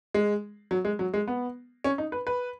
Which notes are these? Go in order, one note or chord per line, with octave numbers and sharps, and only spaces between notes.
G#3
F#3
G#3
F#3
G#3
B3
C#4
D#4
B4
B4